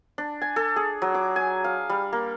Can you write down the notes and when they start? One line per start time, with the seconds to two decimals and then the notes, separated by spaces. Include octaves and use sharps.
0.18 D4
0.41 G#5
0.56 A4
0.76 G#4
1.02 F#3
1.14 D6
1.36 G#5
1.64 F5
1.89 G3
2.12 A#3